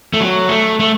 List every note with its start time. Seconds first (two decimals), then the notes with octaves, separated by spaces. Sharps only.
0.14 A3
0.21 F#3
0.49 A3
0.80 A3